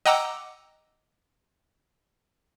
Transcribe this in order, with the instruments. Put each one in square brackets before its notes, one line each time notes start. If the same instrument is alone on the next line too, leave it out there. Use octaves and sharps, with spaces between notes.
[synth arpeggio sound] D#5 F#5 G5 A#5 D6 E6